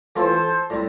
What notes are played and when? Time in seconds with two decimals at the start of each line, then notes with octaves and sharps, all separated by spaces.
0.16 E3 A3 C4 F4 A4 C5
0.70 A2 G3 C4